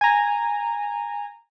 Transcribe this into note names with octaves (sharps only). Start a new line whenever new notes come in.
G#5 A#5